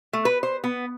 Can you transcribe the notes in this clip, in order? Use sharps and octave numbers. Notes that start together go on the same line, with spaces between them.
A3
B4
C5
B3